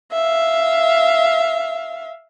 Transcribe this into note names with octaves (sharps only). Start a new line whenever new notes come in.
E5 F5